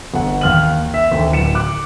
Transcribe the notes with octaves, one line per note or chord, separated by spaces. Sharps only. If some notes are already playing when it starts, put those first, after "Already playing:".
G1 F#5
D#2 F6 F#7
E5
D2 D#3
D1 C#7 E7
D6 F#6